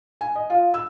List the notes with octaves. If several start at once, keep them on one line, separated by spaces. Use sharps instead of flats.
G#5
D#5
F4
E6